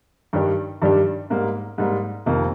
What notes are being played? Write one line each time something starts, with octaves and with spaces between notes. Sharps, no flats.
G2 D#3 G3 D4 G4
G2 D#3 G3 D4 G4
G#2 G3 A#3
G#2 G3 A#3
F1 F2 D#3 A#3